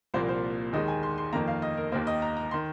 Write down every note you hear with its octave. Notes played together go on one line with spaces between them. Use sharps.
C2 A#2 F3 A#3 C5
C5
D#2 D#3 G#3 D#5
G#5
C6
C6
F2 D#3 A#3 A#5
F5
D#5
A#4
D#2 D#3 A#3 C5
D#5
A#5
A#5
C6
D#3